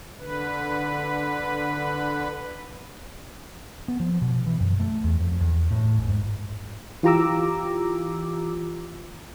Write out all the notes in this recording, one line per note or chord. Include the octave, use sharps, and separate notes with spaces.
D3 B4
B3
F3
B2
E3
F#2
A3
E2
F2
E2
A2
G#1
G#2
E3 F4 G4 A#5 D6 E6